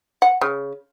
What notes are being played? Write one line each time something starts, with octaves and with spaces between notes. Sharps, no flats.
F#5
C#3